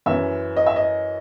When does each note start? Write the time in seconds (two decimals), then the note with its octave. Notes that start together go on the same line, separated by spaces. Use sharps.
0.06 F#2 E3 E5
0.56 D#5
0.66 E5
0.76 D#5